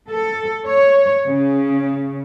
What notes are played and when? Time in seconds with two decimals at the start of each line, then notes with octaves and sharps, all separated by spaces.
0.11 A4
0.67 C#5
1.25 C#3